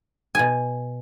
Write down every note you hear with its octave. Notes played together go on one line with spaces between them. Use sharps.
B2 G#5